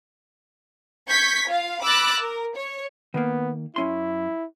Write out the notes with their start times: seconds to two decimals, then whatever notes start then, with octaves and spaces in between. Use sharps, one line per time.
1.09 C#6 G6 G#6 B6
1.49 F4 F5
1.84 B5 D6 E6 F#6 A6 A#6
2.22 A#4
2.55 C#5
3.14 D#3 A#3 B3
3.76 F#2 C#4 E4 C6